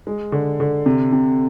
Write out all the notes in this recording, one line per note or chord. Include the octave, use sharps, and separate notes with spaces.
G#3
D3
D3
C3
C3